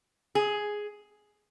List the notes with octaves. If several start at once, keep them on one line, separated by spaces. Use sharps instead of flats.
G#4